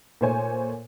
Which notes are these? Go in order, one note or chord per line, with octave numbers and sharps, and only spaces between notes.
A#2 A3 C5 C#5 G#5